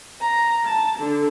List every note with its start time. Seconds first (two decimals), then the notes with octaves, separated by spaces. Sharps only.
0.19 A#5
0.65 A5
0.98 D3